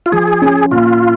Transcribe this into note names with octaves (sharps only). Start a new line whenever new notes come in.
F4
F3 G#4
C#4
A#2 F4